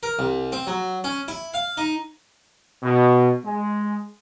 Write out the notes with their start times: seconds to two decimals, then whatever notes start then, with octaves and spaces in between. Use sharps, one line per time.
0.03 A#4
0.19 C2
0.52 C4
0.67 F#3
1.04 C#4
1.28 E4
1.54 F5
1.77 D#4
2.83 B2
3.45 G#3